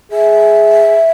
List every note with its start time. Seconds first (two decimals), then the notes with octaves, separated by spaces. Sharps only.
0.12 G#4 E5